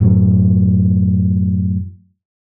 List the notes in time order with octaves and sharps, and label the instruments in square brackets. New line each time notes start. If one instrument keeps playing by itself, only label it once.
[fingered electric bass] F#2 A2 E3 F#3